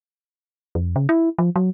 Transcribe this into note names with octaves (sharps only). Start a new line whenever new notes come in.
F2
C#3
E4
F3
F#3